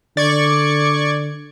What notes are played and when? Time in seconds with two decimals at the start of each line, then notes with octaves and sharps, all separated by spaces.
0.17 D3 D5 C#6 G#6